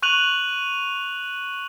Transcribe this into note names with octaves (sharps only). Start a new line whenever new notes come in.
C#6 F#6 D#7 F7 F#7